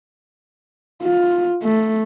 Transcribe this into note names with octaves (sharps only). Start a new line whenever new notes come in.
F4
A3